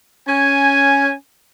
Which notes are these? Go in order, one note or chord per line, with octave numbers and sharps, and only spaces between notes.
C#4 G#5